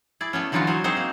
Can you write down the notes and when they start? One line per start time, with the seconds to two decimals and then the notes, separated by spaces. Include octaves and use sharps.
0.21 E4 G#4 D5
0.33 A3 B3 C#4
0.52 D3 E3 F#3 D#4 F4 F#4
0.67 F#3 C5 D#5 G#5
0.84 C4 D#4 F#4 G#4 C5
0.97 A#3